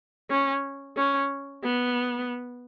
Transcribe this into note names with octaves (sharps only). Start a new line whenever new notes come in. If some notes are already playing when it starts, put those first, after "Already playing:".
C#4
C#4
B3